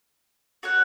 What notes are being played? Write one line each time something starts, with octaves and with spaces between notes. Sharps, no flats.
F#4 C#5 F#5